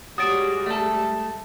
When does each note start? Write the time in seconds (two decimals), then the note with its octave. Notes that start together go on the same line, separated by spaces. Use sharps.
0.18 G3 G#3 F#4 C#5 D#6 A6 D7
0.66 A3 A4